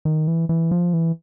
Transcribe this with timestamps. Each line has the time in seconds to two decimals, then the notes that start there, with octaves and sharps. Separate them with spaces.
0.05 D#3
0.28 E3
0.49 E3
0.71 F3
0.93 E3